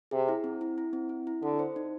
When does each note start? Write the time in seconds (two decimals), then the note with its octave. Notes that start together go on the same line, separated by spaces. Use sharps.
0.11 C3 G#4
0.28 E4
0.44 C4
0.61 E4
0.78 E4
0.93 C4
1.09 E4
1.27 E4
1.42 D3 A4
1.59 C5
1.76 D#4